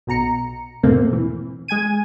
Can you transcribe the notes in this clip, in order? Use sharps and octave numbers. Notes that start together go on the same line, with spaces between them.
B1 B2 A#5 C#7
E2 G#2 B2 A3 A#3 C4
E3
G#3 G#5 G#6 D#7